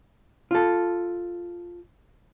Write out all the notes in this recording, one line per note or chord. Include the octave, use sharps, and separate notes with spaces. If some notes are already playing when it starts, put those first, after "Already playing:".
F4 A4